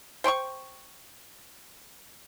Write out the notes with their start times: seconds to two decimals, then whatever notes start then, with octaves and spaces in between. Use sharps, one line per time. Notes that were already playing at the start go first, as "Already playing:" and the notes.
0.24 C5 G5 C6 C#6